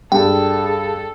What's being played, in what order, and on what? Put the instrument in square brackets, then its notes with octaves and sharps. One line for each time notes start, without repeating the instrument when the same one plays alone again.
[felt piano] G2 [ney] G#4 [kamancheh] A4 [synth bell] G5